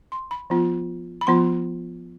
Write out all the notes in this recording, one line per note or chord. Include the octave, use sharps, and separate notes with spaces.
C6
B5
F3 B3 F4
B5
F3 B3 F4 C6